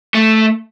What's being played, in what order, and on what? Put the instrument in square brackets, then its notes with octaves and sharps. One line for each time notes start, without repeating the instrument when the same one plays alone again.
[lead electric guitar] A3